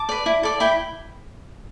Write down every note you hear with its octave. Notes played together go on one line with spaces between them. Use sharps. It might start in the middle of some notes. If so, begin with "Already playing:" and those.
Already playing: A5 D6
B4 D5
E4
A4 D5
E4 G5 B5